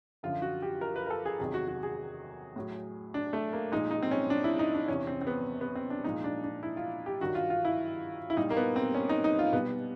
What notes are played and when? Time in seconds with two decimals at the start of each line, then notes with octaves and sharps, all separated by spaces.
0.23 F#2 D3 F3 F4
0.42 F#4
0.62 G4
0.81 A#4
0.96 B4
1.06 A#4
1.10 A4
1.26 G#4
1.39 E2 C3 D#3 F#3 G#4
1.54 F#4
1.68 F#4
1.83 G#4
2.56 A2 F#3
3.14 D4
3.33 A3
3.53 A#3
3.72 A#2 F3 G#3 D#4
3.91 D#4
4.02 C4
4.11 C#4
4.30 D4
4.44 E4
4.59 D#4
4.74 D4
4.88 E2 C3 E3 C#4
5.07 C4
5.21 C4
5.27 B3
5.61 B3
5.75 C4
5.90 D4
6.04 A#2 F3 G#3 D#4
6.24 D4
6.44 D4
6.63 E4
6.77 F4
7.06 G4
7.21 G2 D#3 F#3 F#4
7.35 F4
7.50 F4
7.65 E4
8.30 E4
8.37 A#2 G3 D#4
8.50 A#3
8.57 B3
8.76 C4
8.95 C#4
9.09 D#4
9.24 D#4
9.39 F4
9.53 B2 G3 B3